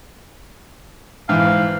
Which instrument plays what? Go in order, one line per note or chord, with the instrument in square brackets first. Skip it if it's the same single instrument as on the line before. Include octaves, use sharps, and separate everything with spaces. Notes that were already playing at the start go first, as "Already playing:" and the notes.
[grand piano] G#2 E3 [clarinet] F5